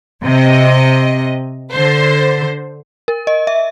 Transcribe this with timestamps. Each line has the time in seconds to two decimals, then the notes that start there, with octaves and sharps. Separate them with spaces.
0.25 C3 D#5
1.71 D3 C5
3.08 A#4
3.27 D#5
3.47 E5